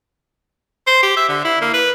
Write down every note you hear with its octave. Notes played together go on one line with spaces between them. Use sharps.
C5
G4
E5
D3
E4
A#3
B4